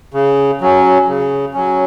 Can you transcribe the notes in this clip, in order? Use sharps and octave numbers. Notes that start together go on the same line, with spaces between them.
C#3
F#3 C#4
C#3
F#3 C#4